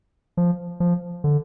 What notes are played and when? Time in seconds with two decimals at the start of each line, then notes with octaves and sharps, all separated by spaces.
0.37 F3
0.80 F3
1.24 D3